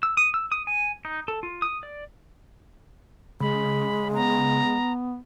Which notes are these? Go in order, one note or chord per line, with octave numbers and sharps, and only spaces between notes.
E6
D#6
E6
D#6
G#5
D#4
A4
F4
D#6
D5
C#3 G#3 B5
B3 A#5